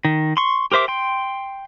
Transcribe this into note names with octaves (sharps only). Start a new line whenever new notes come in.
D#3
C6 C#6
G4 A#4 C5 E5 D6
G5 C6